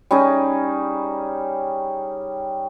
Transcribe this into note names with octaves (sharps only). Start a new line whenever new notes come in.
G3 C#4 D#4 G#4